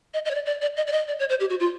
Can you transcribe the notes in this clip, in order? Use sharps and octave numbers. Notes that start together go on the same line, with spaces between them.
D#5
D#5
C#5
D5
D5
D5
D#5
D5
D#5
D5
C#5
C5
G4
F#4
F4